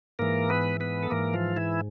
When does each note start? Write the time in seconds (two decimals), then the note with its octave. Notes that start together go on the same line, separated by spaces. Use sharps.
0.19 G#2 E3 A#3 A#4
0.49 B3 B4
0.80 B3 B4
1.03 A4
1.10 G#2 E3 A#3 A#4
1.33 F3 F4
1.56 E3 E4